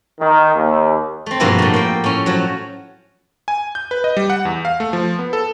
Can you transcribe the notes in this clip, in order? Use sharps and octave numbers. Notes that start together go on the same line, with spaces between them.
D#3
D#2
A3 C4
G2 B2 F3 A#3 B3 E4
A2 A3
A#3 G5
A2 C#4
F3 F#3
G#5
G6
B4
D#5
G3
F#5
E2
F5
A3
F3
B3
A4